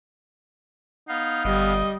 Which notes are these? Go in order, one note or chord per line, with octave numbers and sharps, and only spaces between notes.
B3 D#4 F5
G1 G3 D#5